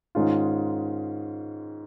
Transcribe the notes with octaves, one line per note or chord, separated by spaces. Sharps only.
G#2 D#3 G#3 C#4 F4